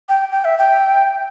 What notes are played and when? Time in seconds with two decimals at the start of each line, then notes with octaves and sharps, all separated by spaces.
0.09 G5
0.32 G5
0.45 E5
0.58 G5